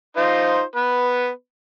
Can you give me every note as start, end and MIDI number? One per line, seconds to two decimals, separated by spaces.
0.17 0.61 63
0.17 0.61 65
0.17 0.61 72
0.76 1.29 59
0.76 1.29 71